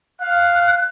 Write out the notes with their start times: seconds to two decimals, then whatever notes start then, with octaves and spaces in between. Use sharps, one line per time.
0.20 F5 F#6